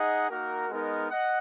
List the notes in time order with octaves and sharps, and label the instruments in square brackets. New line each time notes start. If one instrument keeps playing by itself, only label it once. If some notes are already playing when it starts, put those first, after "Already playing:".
Already playing: [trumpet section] D#4 G#4 D#5 F#5
A#3 D#4 F#4 A#4
G#3 B3 D#4 A#4
D#5 F#5